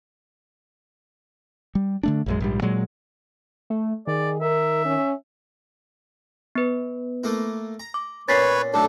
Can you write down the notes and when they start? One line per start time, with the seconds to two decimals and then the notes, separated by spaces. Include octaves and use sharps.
1.75 G3
2.03 D3 A3 D4
2.26 A#1 F#2 G#3
2.40 A#1 G#2 G3
2.62 A#2 F#3 G#3
3.70 A3
4.07 D#3 G#4 D5
4.41 A#4 E5
4.85 C#4
6.55 B3 B4
7.24 A3 A#3 E4
7.80 A#5
7.94 D6
8.29 A#2 B3 C#4 B4 C#5 A6 B6 C7
8.74 B1 A2 D4 A4